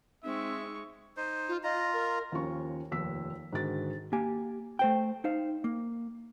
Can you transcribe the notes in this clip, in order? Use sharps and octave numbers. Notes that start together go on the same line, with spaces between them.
G#3 C4 D#4 E5 C#6
D#4 C5
F4
F4 D#5 A#5
A#4
D#2 F3 C#4 C#6
F1 D#2 E6 B6
G#2 D3 D#3 F#4 A6
A#3 G4 G#5
A3 C5 G5
D#4 C5 F5
A#3